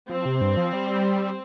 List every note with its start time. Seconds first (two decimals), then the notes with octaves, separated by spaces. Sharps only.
0.09 F3 C4
0.25 C3
0.41 G2
0.57 F3
0.73 G3